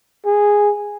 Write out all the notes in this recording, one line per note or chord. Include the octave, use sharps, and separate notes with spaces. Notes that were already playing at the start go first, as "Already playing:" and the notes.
G#4